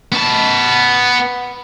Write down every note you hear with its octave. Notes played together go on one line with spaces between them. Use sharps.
B3 A5